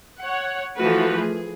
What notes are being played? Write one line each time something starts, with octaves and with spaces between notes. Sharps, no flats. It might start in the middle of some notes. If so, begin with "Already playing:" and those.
C#5 F#5
E3 F3 A3 F#4 B4
G#4